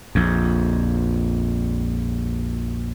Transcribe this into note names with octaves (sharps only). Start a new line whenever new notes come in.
A#1 F2